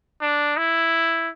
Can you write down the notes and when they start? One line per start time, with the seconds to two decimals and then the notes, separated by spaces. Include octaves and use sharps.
0.22 D4
0.57 E4